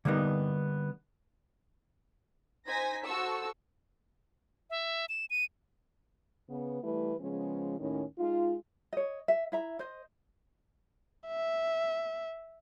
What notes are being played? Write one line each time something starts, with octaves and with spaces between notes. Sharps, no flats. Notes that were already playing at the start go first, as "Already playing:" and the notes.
D3 G3 A#3 B3 D#4
D#4 C5 G#5 G#6 A#6 B6
F#4 A4 C5 A5 C#6 E6
E5
E7
D#7
C#3 B3
E3 G3 A3 E4 B4
C#3 F3 G#3 B3 C#4
D#2 A2 D#3 C#4
G#3 D#4 F4
C#5 D#5
E5
E4 E5 A#5
C5 D#5
E5